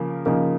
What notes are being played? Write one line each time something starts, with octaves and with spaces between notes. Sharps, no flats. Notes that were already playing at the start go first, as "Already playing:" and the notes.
Already playing: C#3 F3 A#3
C#3 F3 A#3 D#4